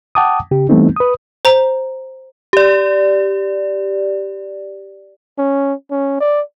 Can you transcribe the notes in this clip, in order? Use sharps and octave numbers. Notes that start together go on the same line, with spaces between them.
F#5 G5 A5 D6 D#6
C#3 G4
E3 G3 A3 B3 C4 D#4
B4 D#6
C5 A#5
G4 D5
C#4
C#4
D5